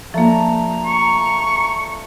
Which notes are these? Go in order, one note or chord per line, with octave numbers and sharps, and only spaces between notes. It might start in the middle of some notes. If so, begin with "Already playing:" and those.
F3 A3 A#3 D4 F4 A#5
C#6